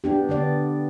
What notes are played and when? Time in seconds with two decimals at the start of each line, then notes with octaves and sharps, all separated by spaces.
0.04 B3 D4 G4
0.29 D3 B3 D5